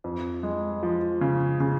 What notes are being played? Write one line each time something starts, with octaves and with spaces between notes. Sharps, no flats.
F2
G#3
F3
C#3
C#3